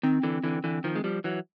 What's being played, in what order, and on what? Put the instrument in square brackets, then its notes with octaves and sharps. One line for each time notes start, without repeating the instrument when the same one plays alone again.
[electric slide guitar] D#3 [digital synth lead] C4
[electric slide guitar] D3 E3
D3 E3
D3 E3
D#3 F3
G#3
F3 G3
E3 F#3